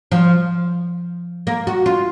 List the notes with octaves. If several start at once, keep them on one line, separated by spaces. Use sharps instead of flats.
F3
A#3
F#4
F4